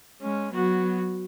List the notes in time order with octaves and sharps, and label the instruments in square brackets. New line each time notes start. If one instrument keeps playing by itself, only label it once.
[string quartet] G#3 C#4
[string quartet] F#3 B3 [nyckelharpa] F#4